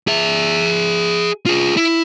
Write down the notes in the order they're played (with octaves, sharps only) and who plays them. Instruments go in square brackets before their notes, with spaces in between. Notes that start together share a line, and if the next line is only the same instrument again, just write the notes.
[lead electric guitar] G#4 E5
F4 G#4
E4